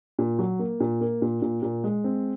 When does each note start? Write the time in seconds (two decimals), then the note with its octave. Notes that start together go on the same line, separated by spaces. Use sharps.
0.19 A#2
0.39 F#3
0.59 A#3
0.80 A#2
1.01 A#3
1.22 A#2
1.42 A#2
1.63 A#2
1.84 G#3
2.04 C4